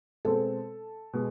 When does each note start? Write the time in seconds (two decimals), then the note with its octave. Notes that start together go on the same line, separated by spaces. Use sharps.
0.25 B2 G#3 C4 A4
1.13 B2 G#3